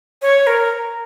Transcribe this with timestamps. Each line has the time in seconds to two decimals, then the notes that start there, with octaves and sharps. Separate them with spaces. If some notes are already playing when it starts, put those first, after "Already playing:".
0.22 C#5
0.47 A#4